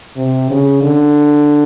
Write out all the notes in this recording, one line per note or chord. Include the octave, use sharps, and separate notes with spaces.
C3
C#3
D3